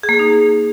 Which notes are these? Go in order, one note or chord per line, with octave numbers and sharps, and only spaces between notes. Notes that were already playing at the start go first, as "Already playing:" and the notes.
G#4
A#3
G#4
D#4